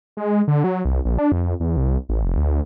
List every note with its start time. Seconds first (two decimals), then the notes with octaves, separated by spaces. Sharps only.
0.17 G#3
0.48 D3
0.64 F#3
0.85 C2
1.05 A#1
1.18 D4
1.32 F2
1.60 E2
1.77 C2
2.09 A1
2.24 F1
2.37 D2